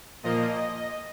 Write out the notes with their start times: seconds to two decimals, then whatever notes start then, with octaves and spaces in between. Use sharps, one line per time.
0.23 A#2 F3 A#3 D#5